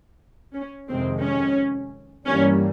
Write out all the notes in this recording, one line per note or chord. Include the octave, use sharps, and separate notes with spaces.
C#4
F2 C3 D#3 G#3 C4
C#4
G2 E3 G3 A#3 C#4